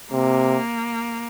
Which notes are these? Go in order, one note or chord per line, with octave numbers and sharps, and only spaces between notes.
C3 A#3